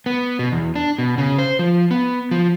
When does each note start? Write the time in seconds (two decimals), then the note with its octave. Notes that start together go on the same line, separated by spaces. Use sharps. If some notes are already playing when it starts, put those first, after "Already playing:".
0.06 B3
0.39 B2
0.52 E2
0.76 D4
0.98 B2
1.18 C#3
1.39 C5
1.59 F3
1.91 B3
2.31 F3